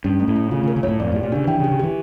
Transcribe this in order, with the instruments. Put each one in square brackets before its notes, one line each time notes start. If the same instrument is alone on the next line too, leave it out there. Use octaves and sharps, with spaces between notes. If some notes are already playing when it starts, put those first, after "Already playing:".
[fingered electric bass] G2 [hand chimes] C#4
[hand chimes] A3
[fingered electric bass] A2
[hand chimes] A3
[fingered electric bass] C#3 [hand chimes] F4
[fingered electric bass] C#3
[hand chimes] A#4
[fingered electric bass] C#3
[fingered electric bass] G2 [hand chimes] C#5
[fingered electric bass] A2
[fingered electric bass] F2 [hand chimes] D5
[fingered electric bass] A2 [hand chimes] G4
[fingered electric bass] A#2
[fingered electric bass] C#3 [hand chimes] D4
[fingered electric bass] E3 [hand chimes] G5
[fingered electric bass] C#3
[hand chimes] G4
[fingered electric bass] C#3
[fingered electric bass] E3 [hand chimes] G4